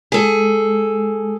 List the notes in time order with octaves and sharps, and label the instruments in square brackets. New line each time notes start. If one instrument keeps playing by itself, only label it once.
[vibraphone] G#3 [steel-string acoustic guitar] G#4 A4